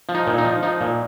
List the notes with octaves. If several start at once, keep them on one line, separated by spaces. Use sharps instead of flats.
F3
D#4
A#2
D#4
F3
F3 D#4
A#2